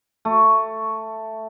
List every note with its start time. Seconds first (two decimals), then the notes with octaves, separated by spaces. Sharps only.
0.25 A3